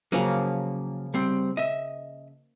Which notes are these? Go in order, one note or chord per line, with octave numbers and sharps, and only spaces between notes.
C#3 F3 F#3 A#3 C#4
G3 C4
D#5 E5